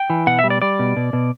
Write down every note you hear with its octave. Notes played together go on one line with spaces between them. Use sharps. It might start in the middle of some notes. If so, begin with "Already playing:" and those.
Already playing: G5
E3
B2 F#5
E5
G3
D5
G3 D5
B2
B2
B2